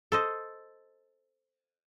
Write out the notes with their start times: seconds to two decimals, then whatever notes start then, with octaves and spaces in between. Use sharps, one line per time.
0.12 A4 C5 D#5